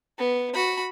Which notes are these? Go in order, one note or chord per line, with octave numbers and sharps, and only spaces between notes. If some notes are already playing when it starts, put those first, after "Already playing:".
B3
F#4 B5